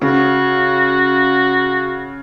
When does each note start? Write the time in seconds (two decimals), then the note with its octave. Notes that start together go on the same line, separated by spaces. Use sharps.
0.02 C#3 F#4